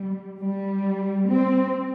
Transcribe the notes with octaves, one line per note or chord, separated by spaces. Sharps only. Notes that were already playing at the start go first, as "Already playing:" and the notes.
Already playing: G3
G3
C4